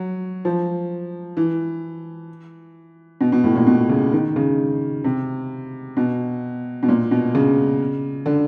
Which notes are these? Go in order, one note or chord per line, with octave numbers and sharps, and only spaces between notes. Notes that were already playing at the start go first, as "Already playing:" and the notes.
Already playing: F#3
F3
E3
B2
B2
A2
A#2
B2
C#3
D#3
C#3
C3
B2
B2
A#2
B2
C#3
D3